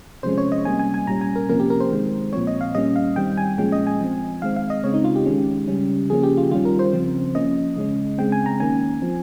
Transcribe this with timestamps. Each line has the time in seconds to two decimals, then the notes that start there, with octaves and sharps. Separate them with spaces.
0.23 C3 F3 G#3 C#4 C5
0.38 C#5
0.52 D#5
0.65 C3 G3 A#3 C#4 G#5
0.79 G#5
0.94 G#5
1.07 A#2 G3 C#4 A#5
1.21 G#5
1.35 A#4
1.49 C3 F3 A#3 C#4 A#4
1.60 G4
1.70 A#4
1.80 C5
1.91 D#3 G#3 C4
2.33 A#2 F3 C4 C#5
2.47 D#5
2.61 F5
2.75 A#2 G3 A#3 C#4 D#5
2.96 F5
3.16 D#3 G3 C4 G5
3.37 G#5
3.58 A#2 F3 G#3 C#4 G5
3.72 D#5
3.87 G#5
4.00 F3 C4
4.42 D#3 G#3 C4 F5
4.56 F5
4.70 D#5
4.84 C#3 G#3 C4 C#5
4.94 D#4
5.04 F4
5.15 G4
5.26 D#3 G#3 C#4
5.68 C#3 G3 C#4
6.10 C#3 F3 A#3 C#4 G#4
6.23 G4
6.37 F4
6.51 D#3 G3 C#4 F4
6.65 A#4
6.79 C5
6.93 C#3 F3 C4
7.35 F3 A#3 C#4 D#5
7.76 C#3 G#3 C#4
8.18 C#3 G#3 C4 G5
8.32 G#5
8.46 A#5
8.60 D#3 A#3 C#4 G#5
9.02 F3 C4